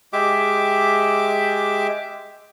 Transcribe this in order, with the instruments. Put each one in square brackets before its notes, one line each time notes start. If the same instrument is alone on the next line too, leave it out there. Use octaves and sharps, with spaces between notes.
[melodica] G#3 G4 E5 D6